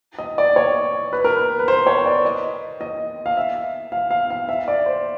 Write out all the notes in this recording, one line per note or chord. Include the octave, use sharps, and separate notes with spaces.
D#5
D5
C#5
B4
A#4
B4
B4
C5
C#5
D5
D#5
D#5
F5
E5
F5
F5
F5
E5
D5
C5